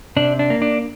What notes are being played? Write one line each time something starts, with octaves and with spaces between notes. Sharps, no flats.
C3 D4
D4
A#3
D4